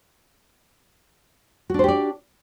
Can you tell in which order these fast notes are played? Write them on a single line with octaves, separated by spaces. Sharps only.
F#4 D4 C5 G4 D5